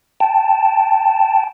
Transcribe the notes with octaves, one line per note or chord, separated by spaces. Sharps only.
G5 A5